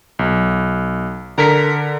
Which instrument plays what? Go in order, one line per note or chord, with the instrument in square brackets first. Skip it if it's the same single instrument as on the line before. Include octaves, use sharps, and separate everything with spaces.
[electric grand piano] B1
[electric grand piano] D3 B6 C#7 [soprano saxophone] A#4